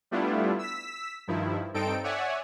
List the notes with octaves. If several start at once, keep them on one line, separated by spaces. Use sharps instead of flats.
G3 A3 B3 D4 E4 F4
E6 B6
G2 D#3 F3 E4
G2 C4 D#4 A4 G5 D7
C#5 D5 E5 F#5 G#5